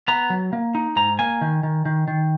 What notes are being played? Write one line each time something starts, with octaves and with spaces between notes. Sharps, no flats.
B3 A#5
F#3
A#3
D#4
G#2 A#5
A#3 G#5
D#3
D#3
D#3
D#3